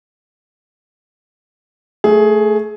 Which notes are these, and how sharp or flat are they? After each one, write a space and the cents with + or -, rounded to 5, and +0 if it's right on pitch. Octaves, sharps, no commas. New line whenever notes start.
A3 +0 G#4 +15